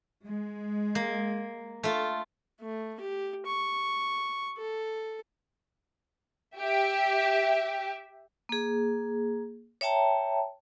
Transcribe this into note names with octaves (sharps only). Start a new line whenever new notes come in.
G#3
A#3
A3 F4
A3
G4
C#6
A4
G4 E5
A#3 G#4
C#5 E5 G5 A5 A#5